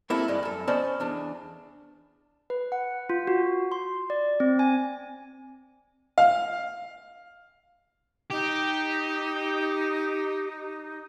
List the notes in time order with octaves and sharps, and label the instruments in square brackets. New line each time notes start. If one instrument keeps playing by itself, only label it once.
[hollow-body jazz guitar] A#3 C4 E4 G4 A4 A#4
G2 G3 G#3
F#2 A4
B3 C#4 C5 D5 D#5 A5
E2 D4
[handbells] B4
F#5
F4
F#4
C6
D5
C4
G#5
[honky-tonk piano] F5
[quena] D#4 [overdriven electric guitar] G4